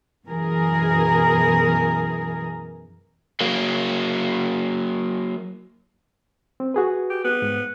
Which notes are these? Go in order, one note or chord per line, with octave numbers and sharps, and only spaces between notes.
F#2 B2 E3 G#4 A#4
F#3 A#3
C4
F#4 G#4 B4
G4
B3
G#2